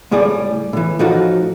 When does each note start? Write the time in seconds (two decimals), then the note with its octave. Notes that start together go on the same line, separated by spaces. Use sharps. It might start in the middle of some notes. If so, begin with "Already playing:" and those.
0.11 C#2 A2 G3 G#4 D5
0.73 A2 E3
0.99 A2 E3 F3 D#4 F#4 A4